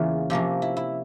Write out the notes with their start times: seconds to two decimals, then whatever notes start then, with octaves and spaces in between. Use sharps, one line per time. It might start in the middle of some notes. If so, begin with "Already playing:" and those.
Already playing: E2 C#3 E3 A#3 C#4 F4
0.30 C3 F3 A#3 C#4
0.62 E4
0.77 E4